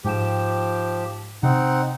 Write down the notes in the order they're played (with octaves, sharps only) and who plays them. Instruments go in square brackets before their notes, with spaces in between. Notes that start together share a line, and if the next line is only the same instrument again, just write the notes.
[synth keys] G#2 G5 E7 [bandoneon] F3 G4
[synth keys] C3 [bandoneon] C4 D#4 F#5